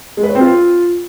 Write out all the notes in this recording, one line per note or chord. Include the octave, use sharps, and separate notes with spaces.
G#3
B4
C#5
C4
F4